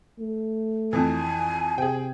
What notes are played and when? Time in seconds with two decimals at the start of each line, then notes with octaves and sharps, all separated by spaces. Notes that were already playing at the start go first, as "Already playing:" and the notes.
0.19 A3
0.93 F2 E3 G#5
1.78 C3 G#4 G5